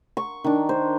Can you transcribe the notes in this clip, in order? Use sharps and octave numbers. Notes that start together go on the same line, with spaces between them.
C#6
D#3 D4
C5